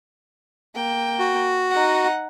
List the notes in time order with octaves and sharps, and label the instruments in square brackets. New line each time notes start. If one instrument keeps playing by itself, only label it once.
[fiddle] A#3 G5
[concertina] F#4
[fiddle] D#4 F#5